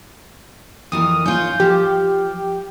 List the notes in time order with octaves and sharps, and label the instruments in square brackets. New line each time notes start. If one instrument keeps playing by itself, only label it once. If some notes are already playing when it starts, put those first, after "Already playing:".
[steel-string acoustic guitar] F2 E3 A#4 [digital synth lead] D#6
[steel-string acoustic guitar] C#4 F4 [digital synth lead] G6
[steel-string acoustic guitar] F3 [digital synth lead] G4